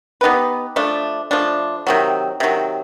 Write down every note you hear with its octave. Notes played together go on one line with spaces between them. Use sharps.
B3 D#4 G4 B4
F3 A3 D4
F3 A3 D4
C3 D#3 F#3
C3 D#3 F#3